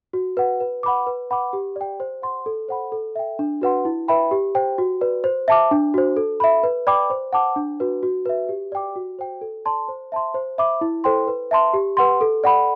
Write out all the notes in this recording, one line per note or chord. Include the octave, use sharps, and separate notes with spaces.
F#4
B4 F#5
B4
F#5 B5 D6
B4
F#5 B5 D6
G4
D5 G5
C5
F#5 C6
A4
C5 F#5 B5
A4
E5 G5
D4
F#4 B4 F#5 C6
E4
B4 E5 G5 B5
G4
C5 G5
F#4
B4 D5
C5
E5 A5 D6
D4
F#4 C5
A4
E5 B5
B4
D5 G5 B5 D6
C5
F#5 A5 D6
D4
F#4 B4
F#4
B4 E5
G4
D5 G5 D6
F#4
C5 G5
A4
D5 A5 C6
C5
E5 A5 C6
C5
E5 B5 D6
E4
A4 C5 G5 C6
B4
E5 A5 C6
G4
B4 F#5 C6
A4
D5 F#5 B5